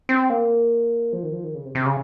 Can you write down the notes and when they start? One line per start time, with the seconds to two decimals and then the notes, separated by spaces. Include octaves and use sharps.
0.09 C4
0.30 A#3
1.13 F3
1.23 D#3
1.33 F3
1.44 D#3
1.54 C#3
1.65 C3
1.75 C3
1.86 C#3